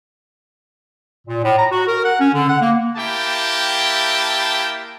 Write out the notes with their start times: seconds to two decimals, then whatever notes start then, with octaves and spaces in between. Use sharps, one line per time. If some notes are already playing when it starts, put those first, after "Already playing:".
1.27 A#2
1.44 A2
1.58 A#5
1.71 F#4
1.87 A#4
2.05 F#5
2.19 C#4
2.34 D3
2.49 F#5
2.61 A#3
2.96 A#3 E4 G4 G5 A5